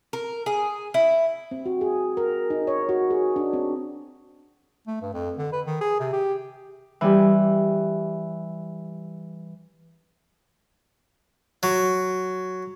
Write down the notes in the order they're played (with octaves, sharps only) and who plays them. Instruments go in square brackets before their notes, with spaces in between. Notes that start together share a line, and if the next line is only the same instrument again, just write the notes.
[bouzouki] A#4
G#4
E4
[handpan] C4
F#4
G#4
A#4
D#4
C#5
F#4
G#4
D4
C4
[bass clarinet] A3
G2
F2
D3
B4
D#3
G#4
C3
G4
[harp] E3 G3 G4
[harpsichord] F#3